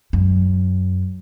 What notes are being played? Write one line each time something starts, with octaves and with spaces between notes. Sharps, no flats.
F#2